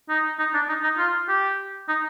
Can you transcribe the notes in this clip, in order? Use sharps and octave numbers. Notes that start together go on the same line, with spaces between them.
D#4
D#4
D4
D#4
D#4
F4
G4
D#4